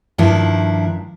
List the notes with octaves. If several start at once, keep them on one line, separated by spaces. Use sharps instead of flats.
G2 D#3 F3 D4 E4